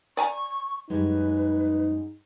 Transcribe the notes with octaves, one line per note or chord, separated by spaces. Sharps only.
D5 G#5 A#5 C#6
F#2 G3 G#3 D#4 B4